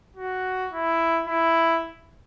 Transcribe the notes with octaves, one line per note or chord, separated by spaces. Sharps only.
F#4
E4
E4